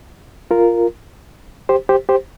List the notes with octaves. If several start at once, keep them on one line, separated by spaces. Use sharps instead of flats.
F4 A#4
G4 C5
G4 C5
G4 C5